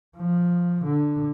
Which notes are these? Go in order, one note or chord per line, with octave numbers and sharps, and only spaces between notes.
F3
D3